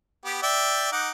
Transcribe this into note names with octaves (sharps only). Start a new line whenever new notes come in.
B3 G4
D5 E5 G5
D#4 F#5 D6